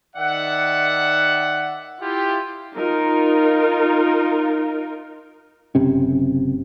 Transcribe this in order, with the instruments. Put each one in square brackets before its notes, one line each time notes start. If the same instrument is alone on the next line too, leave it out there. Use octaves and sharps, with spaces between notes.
[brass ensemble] D#3 D5 E5 F#5
E4 F4 G4
[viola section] D#4 F4 A#4
[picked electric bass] F#1 C3 C#4